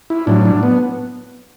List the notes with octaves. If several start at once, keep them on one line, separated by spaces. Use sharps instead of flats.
E4
A2 F#3 D4
D4
B3